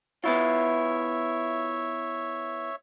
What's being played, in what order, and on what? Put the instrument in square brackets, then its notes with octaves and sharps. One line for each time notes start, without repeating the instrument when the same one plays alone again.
[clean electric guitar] B3 E4 F4 [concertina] C#5 E5